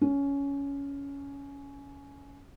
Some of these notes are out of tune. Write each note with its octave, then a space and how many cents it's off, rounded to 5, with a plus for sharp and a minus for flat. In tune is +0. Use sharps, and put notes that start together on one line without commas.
C#4 +15